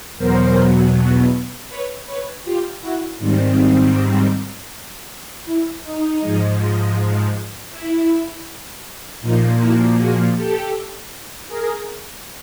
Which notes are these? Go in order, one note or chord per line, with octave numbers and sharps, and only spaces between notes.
E2 B2 F#3 B3 A#4 C5
B4 C#5
B4 C#5
F4 G4
E4 F#4
G#2 D#3 G3 C4
E4
D#4
G#2 F3 G#3
E4
A#2 F3 A#3 D#4 F4
E4 F#4
F#4 G#4
G4 A4
G#4 A#4